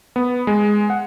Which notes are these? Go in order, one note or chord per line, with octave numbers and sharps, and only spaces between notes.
B3
G#3
F#5